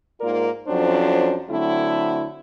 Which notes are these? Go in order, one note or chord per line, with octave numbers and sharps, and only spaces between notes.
G#2 A#3 F4 A#4 D5
F2 F#3 C#4 D4 C5
D3 F#3 A3 C4 E4